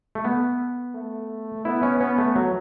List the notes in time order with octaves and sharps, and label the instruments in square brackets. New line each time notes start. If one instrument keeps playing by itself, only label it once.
[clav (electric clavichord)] A3
B3
[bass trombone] A3
[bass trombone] B3 [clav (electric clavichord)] E4
[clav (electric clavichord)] C#4
[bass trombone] B3 [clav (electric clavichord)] C#4
[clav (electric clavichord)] A3
F#3